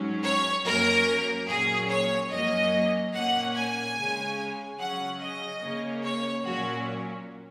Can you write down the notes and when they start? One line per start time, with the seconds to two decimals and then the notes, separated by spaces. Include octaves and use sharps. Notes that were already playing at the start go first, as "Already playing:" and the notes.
Already playing: G#2 F#3 C#4
0.24 C#5
0.65 F#2 F#3 A#3 C#4 A#4
1.48 A#2 F#3 C#4 G#4
1.89 C#5
2.30 F#2 F#3 A#3 C#4 D#5
3.13 A#2 A#3 C#4 F#5
3.54 G#5
3.96 C#3 G#3 C#4
4.78 C#3 F#3 C#4 F#5
5.20 D#5
5.61 C#3 A#3 C#4
6.03 C#5
6.44 A#2 F#3 C#4 F#4